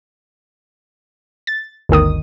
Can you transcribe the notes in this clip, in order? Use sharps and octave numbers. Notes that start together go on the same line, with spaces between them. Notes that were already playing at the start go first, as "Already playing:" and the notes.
A6
G1 D2 D#3 D#6